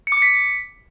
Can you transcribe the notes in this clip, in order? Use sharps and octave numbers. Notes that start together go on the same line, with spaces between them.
C#7
D6
C#7
B6